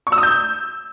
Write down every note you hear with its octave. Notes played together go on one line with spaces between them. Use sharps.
C#6
E6
D#6
G6